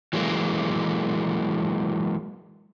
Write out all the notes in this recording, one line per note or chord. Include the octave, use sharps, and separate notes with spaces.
E3 F#3 G#3 A#3